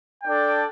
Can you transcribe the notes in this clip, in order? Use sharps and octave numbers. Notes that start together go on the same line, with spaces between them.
D4 A4 D5 G5